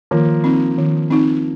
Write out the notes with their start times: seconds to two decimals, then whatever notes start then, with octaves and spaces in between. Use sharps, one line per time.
0.11 D#3 F3 A#3
0.44 C4 D#4
0.78 D#3
1.11 C4 D#4